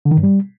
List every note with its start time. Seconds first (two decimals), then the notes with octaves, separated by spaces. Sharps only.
0.05 D3
0.11 D#3
0.17 G2
0.23 G3